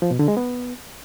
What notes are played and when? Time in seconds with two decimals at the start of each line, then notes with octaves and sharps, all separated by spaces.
0.02 F3
0.11 B2
0.19 D3
0.28 G#3
0.37 B3